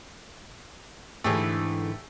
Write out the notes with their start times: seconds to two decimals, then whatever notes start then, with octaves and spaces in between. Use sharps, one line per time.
1.24 G#2 D3 E3 A3 G4 G#4